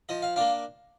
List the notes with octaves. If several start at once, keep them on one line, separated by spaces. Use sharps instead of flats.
F3 D#5
F5
A#3 D4 F5